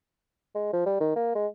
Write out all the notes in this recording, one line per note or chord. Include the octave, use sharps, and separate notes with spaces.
G#3
F3
G3
D#3
A#3
G#3